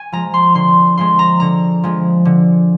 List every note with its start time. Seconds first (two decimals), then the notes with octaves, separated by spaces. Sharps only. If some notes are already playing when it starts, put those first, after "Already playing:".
Already playing: G#5
0.12 F3 G#3 A#5
0.34 C6
0.55 D3 C6
0.97 F3 G#3 C6
1.19 A#5
1.40 D3 A#5
1.84 F3 G#3
2.25 D3